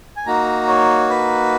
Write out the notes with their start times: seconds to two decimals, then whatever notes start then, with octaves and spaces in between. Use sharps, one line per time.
0.17 G#5
0.27 A#3 D#4 F#4 A#5
0.68 C#5
1.10 B4